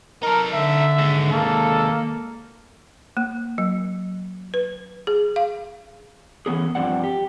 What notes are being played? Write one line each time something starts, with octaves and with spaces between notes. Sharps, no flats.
D#4 A4 A#4
D3 E5
D#2 G#3
A#3 A4
A#3
F#3
B4
G#4
F5
E3 B3 C#4 G#4
G2 F3 G#3 C4 D5 F#5
G4